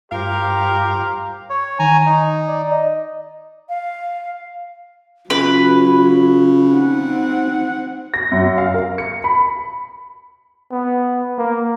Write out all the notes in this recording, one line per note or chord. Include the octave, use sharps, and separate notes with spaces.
G2 F4 G4 A#4 C5 F5 A#5
C#5
D#3 G#5 A#5
D#4
D5
D#5
F5
C#3 F#3 F4 B4
C4 D#4 F#5
A#6
F#2
F5
A#4
C#7
B5
B3
A#3